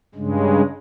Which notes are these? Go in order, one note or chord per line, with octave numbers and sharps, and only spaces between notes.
G2 C#3 G#3